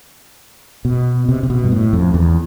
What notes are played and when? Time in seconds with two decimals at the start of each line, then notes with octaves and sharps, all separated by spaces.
0.85 B2
1.29 C3
1.43 C3
1.50 B2
1.64 G2
1.72 A2
1.93 F2
2.14 E2